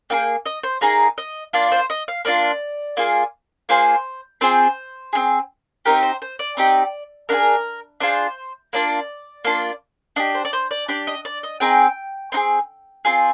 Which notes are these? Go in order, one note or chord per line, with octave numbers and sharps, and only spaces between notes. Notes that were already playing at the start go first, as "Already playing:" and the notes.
A#3 D#4 G#4 G5
D#5
C5
A#3 D#4 G#4 A#5
D#5
A#3 D4 F4 D5
C5
D#5
F5
A#3 D4 F4 D5
A#3 F4 G#4
A#3 F4 G#4 C5
C4 F4 G#4 C5
C4 F4 G#4
C4 D#4 G4 A#4
C5
C5
D5
C4 D#4 G4
D4 F4 G#4 A#4
D4 F4 G#4 C5
A#3 D4 F4 D5
A#3 D4 F4
D4 G4 D#5
C5
D5
C5
D5
D4 G4 D5
D#5
D5
D#5
C4 D#4 G#4 G5
C4 D#4 G#4
C4 F4 G#4